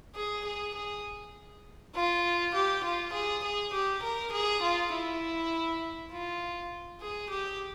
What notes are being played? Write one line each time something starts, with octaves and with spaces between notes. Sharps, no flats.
G#4
G#4
G#4
F4
G4
F4
G#4
G#4
G4
A#4
G#4
F4
E4
F4
G#4
G4